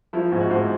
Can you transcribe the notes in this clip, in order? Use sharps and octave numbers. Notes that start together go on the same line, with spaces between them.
F3 E4
G#2
F#4
G#2